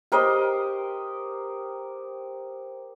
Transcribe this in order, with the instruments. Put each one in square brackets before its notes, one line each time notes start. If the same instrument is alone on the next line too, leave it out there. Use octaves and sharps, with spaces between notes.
[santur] G4 A#4 C5 D#5